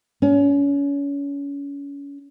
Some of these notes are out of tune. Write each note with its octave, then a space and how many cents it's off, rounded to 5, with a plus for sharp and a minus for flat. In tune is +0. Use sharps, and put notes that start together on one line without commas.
C#4 +30